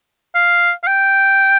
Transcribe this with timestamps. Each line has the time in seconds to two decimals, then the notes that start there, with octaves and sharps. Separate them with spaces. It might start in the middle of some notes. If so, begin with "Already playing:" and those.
0.35 F5
0.83 F5
0.87 G5